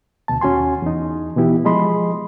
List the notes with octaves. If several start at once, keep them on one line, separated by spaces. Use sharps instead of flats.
D2 B2 A5
D#2 C#4 F#4 G#5 C6
E2 D#4
B2 E3 B3 E4 G4
F3 G#3 G#4 D#5 B5 C6